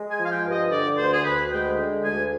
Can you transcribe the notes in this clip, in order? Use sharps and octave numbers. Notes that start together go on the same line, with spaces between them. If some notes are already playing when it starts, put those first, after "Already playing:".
Already playing: G#3
G#5
F3
F5
G5
G2
D#5
D3 D5
D2 C5
G#4
D2 B4
G#3 G5
D3
D2 G#5